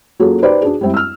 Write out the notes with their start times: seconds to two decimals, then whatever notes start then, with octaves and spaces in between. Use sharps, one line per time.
0.20 F#3 A#3 C#4 F4 G#4 A4
0.42 D#4 G4 B4 C5 D5
0.61 D4 F#4 G#4
0.81 G3 G#3 C4 E4
0.94 E6 F6